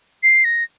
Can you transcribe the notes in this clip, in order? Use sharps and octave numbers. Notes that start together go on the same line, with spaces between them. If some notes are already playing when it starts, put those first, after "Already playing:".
C7
A#6